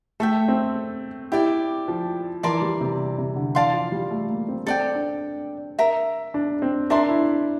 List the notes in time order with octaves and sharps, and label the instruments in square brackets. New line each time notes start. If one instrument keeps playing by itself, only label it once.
[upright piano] A3 [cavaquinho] A4 E5 G5
[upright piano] C4
[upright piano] E4 [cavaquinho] G4 D5 G5
[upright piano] F3
[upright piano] E3 [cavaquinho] A#4 D5 A5 C6
[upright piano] G3
C3
C3
D3
[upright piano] E3 [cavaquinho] D5 F5 A5 C6
[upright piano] F3
G3
A3
A#3
C4
[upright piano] C4 [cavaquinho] A4 D5 G5
[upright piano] D4
[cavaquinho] A#4 E5 A#5
[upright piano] D4
C4
[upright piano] D4 [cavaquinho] A#4 E5 A5 C6
[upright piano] E4